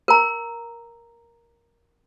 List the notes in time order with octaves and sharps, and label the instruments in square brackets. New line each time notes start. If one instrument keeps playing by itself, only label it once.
[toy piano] A#4 A#5